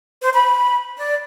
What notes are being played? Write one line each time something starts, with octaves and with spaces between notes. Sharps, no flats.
C5
B5
D5